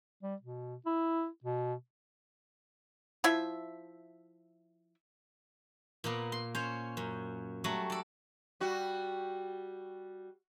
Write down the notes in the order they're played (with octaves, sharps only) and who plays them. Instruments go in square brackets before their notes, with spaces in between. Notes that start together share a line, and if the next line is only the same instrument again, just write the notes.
[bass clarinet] G3
B2
E4
B2
[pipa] F3 E4 E5
[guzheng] A#2 A#3 B3
C6
C#4 C5 C#5
F#2
F#3 G3 A3 F#4
A4 D5
[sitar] G3 F#4